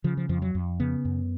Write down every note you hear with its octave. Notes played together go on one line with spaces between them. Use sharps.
C#3 F3
F3
F2 F3
F#3
F2
C#3 B3
F#2